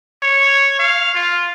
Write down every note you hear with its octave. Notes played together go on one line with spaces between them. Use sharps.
C#5
F5
F4